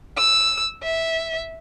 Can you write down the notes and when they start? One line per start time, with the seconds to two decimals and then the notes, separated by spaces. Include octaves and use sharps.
0.18 E6
0.83 E5